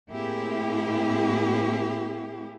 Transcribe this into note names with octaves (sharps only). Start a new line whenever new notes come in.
A2 A#3 C4 E4 G4 G#4